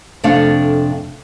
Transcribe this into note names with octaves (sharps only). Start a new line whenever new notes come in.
F2 C3 A3 D4 F5